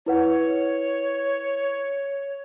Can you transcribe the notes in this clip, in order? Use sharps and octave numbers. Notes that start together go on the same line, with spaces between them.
E4 B4 C#5 F#5